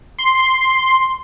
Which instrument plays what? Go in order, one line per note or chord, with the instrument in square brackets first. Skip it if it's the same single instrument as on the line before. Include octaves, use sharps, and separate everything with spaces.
[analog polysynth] C6